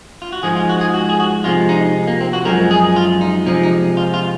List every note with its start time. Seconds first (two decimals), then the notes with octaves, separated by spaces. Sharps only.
0.22 F4
0.33 F#4
0.43 G#2 F3 G#3 G#4
0.56 F4
0.69 F#4
0.81 G#4
0.94 F#4
1.09 G#4
1.20 F#4
1.44 C3 F3 G#3 F4
1.69 D#4
2.07 A#3
2.21 C4
2.33 F#4
2.45 F#2 F3 G#3 A#4
2.71 G#4
2.96 F4
3.21 D#4
3.46 C3 F3 G#3 D#4
3.63 D#4
3.97 F4
4.14 F4